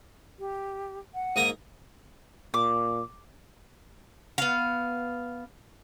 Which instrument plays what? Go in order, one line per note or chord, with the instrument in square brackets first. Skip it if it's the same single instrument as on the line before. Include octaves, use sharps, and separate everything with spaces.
[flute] G4
F#5
[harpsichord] G#2 A#3 A#5 [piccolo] D#7
[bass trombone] A#2 [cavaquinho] D6
[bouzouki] B3 F5